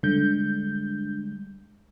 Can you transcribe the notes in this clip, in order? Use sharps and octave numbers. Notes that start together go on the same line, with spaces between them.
D3 G3 G#3 G6